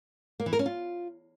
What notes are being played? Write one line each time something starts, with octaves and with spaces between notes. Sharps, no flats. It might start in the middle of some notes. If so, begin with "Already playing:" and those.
A#3
E3
A#4
C#4
F4